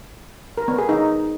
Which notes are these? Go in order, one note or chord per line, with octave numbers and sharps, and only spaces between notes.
A#4
B3
G#4
D#4